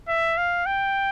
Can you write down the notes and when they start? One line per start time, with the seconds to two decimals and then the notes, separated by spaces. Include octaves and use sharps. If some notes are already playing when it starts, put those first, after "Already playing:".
0.08 E5
0.37 F5
0.66 G5